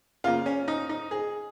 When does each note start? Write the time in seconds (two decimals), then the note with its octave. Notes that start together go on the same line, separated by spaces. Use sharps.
0.24 C#3 A#3 F4
0.46 C#4
0.68 D#4
0.89 D#4
1.11 G#4